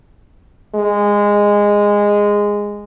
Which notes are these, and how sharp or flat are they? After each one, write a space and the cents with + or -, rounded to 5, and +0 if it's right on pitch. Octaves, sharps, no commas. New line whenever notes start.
G#3 -15